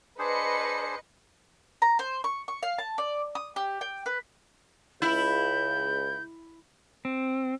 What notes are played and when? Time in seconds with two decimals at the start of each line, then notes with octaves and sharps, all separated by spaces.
0.19 D4 G#4 B4 C5 D#5 C#7
1.82 A#5
1.99 C5
2.24 C#6
2.48 C#6
2.63 F5
2.78 A5
2.98 D5
3.35 D#6
3.56 G4
3.81 G5
4.06 B4
5.02 C#2 E4 G6
7.05 C4